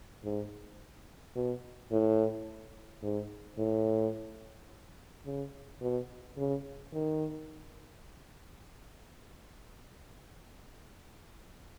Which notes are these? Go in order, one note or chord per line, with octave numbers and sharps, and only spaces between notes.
G#2
B2
A2
G#2
A2
C#3
B2
C#3
D#3